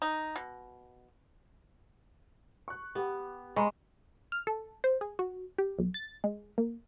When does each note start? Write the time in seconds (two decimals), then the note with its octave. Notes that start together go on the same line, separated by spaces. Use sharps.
0.02 D#4
0.36 B2
2.68 C#6 F#6
2.95 B3 G4
3.56 G#3 A#5 B5 C#6
4.32 F6
4.47 A4
4.84 C5
5.01 G#4
5.19 F#4
5.58 G4
5.79 B1
5.94 A6
6.24 G#3
6.58 A#3